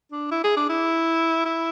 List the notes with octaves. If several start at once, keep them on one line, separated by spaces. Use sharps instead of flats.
D4
E4
G#4
D4
E4
E4